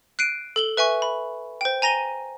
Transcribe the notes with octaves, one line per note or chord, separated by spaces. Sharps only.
F#6 C7 D7 D#7
A4 F#7 G7
B4 E5 G#5 C#6
B5
C5 G5
G#5 A#5 A#6 D#7 G7